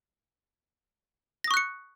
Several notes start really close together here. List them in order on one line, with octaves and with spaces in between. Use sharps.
A#6 D#6 C#6 F#6 C#7